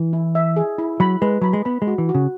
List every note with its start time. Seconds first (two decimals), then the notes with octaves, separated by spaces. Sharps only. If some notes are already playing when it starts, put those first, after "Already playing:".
Already playing: E3
0.13 E4
0.35 E5
0.57 G#4
0.79 E4
1.00 F#3 B5
1.22 G#3 B4
1.41 F#3 B5
1.53 G#3
1.65 B3 B5
1.82 G#3
1.87 F#4
1.98 E3
2.09 F#4
2.15 C#3